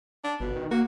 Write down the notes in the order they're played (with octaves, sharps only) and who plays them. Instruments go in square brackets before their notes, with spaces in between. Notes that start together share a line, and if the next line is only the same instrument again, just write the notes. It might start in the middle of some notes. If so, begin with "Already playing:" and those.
[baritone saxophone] D4
[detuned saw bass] G1 [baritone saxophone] B2
[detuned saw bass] D#3
[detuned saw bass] A#3 [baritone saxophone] F#4